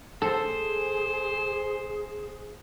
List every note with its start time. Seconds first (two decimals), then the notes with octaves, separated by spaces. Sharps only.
0.22 G#4 A4 C5